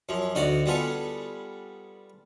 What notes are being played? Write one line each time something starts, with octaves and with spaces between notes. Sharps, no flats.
F#2 F3
D2 D#4 F#4 D5 F#5
G3 B3 F4 G#4 A4